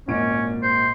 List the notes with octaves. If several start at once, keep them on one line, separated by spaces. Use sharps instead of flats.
G#1 A#2 C#4 D7
C5